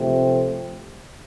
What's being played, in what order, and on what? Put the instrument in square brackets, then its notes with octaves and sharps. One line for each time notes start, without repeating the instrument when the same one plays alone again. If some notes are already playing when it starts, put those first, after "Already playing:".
Already playing: [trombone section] C3 F3 A3 C4